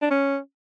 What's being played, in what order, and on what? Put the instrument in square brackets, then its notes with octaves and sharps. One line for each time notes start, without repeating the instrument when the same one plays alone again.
[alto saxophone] D4
C#4